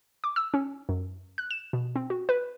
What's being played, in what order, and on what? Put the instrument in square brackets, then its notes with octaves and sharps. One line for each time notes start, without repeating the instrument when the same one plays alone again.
[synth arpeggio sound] D6
E6
C#4
F#2
F#6
E7
B2
C4
F#4
B4